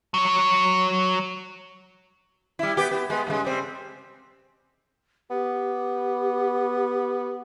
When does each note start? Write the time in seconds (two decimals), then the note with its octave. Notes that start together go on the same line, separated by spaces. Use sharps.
0.14 F#3 C#5
2.59 G3 E4
2.77 B3 G4
2.91 B3
3.10 G#3 B3
3.27 G2 C#3 G#3
3.44 G3 C4
5.30 B3 G4